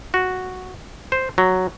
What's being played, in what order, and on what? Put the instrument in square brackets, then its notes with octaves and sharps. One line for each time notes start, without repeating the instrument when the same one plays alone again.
[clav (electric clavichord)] F#4
C5
F#3